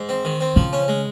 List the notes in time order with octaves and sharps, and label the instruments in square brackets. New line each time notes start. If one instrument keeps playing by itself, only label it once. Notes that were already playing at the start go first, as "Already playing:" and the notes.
Already playing: [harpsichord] G#2
C4
D#3
C4
[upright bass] C#3 [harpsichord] F3
[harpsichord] C#4
G#3